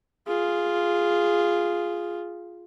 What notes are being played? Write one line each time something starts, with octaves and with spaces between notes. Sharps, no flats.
F4 G#4